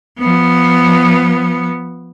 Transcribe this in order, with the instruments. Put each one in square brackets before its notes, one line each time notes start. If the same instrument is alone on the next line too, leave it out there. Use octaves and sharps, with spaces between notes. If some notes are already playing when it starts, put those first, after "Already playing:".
[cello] F3 B3